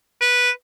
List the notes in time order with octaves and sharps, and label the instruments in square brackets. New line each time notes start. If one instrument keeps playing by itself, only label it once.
[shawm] B4